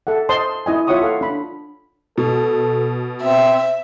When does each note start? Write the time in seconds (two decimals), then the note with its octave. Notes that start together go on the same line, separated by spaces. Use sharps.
0.07 A4 E5 F#5
0.29 C5 D#5 A5 C6
0.66 E4 D#5 G#5
0.87 F4 C#5 E5 F#5 C#6 D#6
1.02 A4 F5 F#5
1.21 D4 B5
2.18 B2 A4
3.23 C4 E5